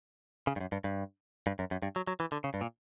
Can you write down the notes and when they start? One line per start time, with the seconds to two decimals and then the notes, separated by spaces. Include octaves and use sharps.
0.47 C#3
0.56 G2
0.60 F#2
0.72 G2
0.84 G2
1.47 G2
1.59 F#2
1.71 F#2
1.82 G2
1.96 F#3
2.07 F#3
2.20 E3
2.32 D3
2.44 C#3
2.54 G2
2.61 A#2